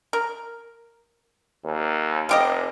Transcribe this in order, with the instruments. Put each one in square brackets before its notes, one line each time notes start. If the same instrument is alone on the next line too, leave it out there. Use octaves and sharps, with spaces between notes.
[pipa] A#4
[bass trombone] D#2
[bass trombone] F1 [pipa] F4 G4 D#5